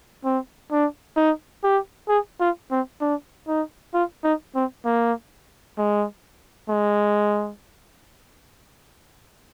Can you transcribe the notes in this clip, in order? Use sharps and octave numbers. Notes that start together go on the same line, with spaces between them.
C4
D4
D#4
G4
G#4
F4
C4
D4
D#4
F4
D#4
C4
A#3
G#3
G#3